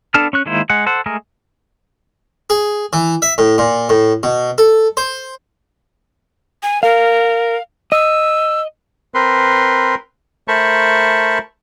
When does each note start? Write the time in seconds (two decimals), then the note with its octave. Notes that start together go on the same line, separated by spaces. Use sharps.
0.14 B3 D4 A4 A5 F6
0.33 C#4 C#6 F#6
0.46 D#3 G#3 A#3 E4 C5
0.70 G#3 F#5
0.86 A4 C5 F#5
1.06 G#3 A3 G#4 A#4
2.50 G#4
2.93 E3
3.22 E5
3.38 A2
3.58 A#2
3.89 A2
4.23 B2
4.58 A4
4.97 C5
6.63 G#5
6.83 A#4 F5
7.92 D#5 E6
9.14 C4 A#4 B4 C6
10.48 A3 A#4 C5 A5 B5 C#6